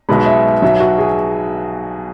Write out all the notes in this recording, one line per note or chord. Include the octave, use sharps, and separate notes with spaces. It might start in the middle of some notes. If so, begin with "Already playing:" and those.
B1 B2 G#3 B5
E5
B1 B2 F#3 E5
F#4
G#4